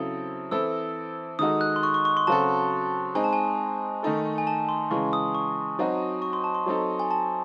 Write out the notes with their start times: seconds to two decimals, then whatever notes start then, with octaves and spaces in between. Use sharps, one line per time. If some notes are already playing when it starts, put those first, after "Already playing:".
Already playing: C#3 F#3 C4 E4 A4 D#6
0.51 E3 C4 E4 A4 E6
1.39 D#3 G#3 D#4 F#4 A4 D#6
1.61 F#6
1.76 C6
1.83 C#6
1.94 C#6
2.05 C#6
2.17 C6
2.27 C#3 F#3 C4 F#4 A4 A5
3.15 G#3 C4 D#4 G#5
3.24 A5
3.33 G#5
4.03 D#3 A3 D#4 A4
4.38 G#5
4.47 A5
4.69 C6
4.90 C#3 E3 G#3 C#6
5.13 D#6
5.35 C#6
5.79 F#3 C4 D#4 F#4
6.22 C#6
6.33 C6
6.44 A5
6.55 C6
6.66 F#3 C4 D#4 A4
7.00 G#5
7.11 A5